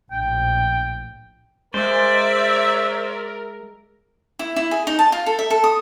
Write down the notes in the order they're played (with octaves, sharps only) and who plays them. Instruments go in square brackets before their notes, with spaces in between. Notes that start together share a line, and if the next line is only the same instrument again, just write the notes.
[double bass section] A#1 A2 [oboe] G5
[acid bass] G#3 [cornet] A#4 [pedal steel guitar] C5 [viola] D5 E5
[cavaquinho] E4
E4
G#4
D#4
A5
F4
A4
E5
A4
D#6